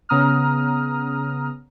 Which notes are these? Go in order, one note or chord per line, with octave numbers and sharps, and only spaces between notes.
C#3 B3 A#5 D#6 F6